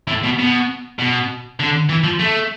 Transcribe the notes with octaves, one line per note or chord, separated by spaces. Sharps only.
A2
B2
B2
B2
D3
E3
F3
A3